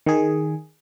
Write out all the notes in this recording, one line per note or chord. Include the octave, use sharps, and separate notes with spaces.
D#3 G#4